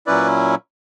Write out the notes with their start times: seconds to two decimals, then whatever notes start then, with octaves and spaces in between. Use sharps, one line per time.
0.07 A#2 F#3 C#4 E4 B4 D5